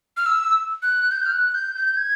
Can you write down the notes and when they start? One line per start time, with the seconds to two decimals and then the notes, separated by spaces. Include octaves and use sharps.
0.17 F6
0.26 E6
0.83 F#6
1.11 G6
1.26 F6
1.33 F#6
1.54 G6
1.75 G6
1.97 G#6